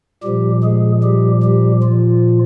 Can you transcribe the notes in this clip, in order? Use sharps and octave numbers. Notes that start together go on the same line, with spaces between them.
A#2 F3 G3 G4
G#3 G#4
G3 G4
G3 G4
F3 F4